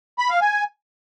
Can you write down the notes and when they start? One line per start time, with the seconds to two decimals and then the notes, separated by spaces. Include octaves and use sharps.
0.19 B5
0.30 F5
0.41 G#5